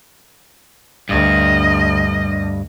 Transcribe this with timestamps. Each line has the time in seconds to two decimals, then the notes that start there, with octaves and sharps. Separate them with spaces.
1.09 D2 G2 D#5